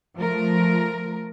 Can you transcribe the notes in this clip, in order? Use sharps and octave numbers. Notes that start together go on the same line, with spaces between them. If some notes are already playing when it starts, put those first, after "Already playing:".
F3 A3 A#4